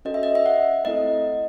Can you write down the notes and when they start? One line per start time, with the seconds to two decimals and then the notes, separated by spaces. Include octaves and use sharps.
0.05 C#4 F#4 A4 D#5
0.14 E5
0.23 D#5
0.35 E5
0.46 F#5
0.85 A3 C4 E4 A4 D#5